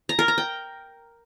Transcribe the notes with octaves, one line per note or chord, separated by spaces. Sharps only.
A#5
A#4
A#5
G5